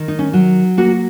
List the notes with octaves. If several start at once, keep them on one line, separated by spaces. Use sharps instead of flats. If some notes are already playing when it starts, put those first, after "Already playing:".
Already playing: D#3
D#4
C#4
F#3
A#3 F#4